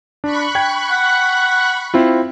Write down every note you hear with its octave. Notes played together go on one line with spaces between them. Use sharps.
D4 B5 C#6 F#6
G5 G#6
F#5
C4 E4 F4